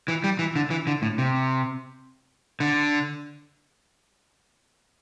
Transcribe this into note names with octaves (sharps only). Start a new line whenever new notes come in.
E3
G3
E3
D3
E3
D3
A2
C3
D3